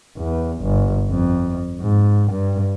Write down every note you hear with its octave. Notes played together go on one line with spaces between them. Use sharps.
E2
G1
F2
G#2
G2